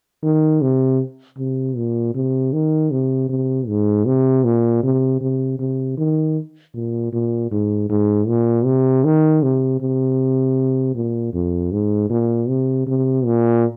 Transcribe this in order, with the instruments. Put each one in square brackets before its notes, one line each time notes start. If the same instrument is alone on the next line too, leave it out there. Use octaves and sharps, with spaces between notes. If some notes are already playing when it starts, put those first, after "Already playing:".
[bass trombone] D#3
C3
C3
A#2
C3
D#3
C3
C3
G#2
C3
A#2
C3
C3
C3
D#3
A#2
A#2
G#2
G#2
A#2
C3
D#3
C3
C3
A#2
F2
G#2
A#2
C3
C3
A#2